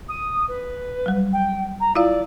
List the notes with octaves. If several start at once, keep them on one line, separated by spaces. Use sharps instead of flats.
D#6
B4
F#3 G3
G5
A#5
E4 F4 D5 F5